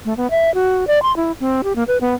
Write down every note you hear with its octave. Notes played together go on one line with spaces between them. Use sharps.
A3
B3
E5
F#4
D5
C6
E4
C4
G4
A#3
B4
B3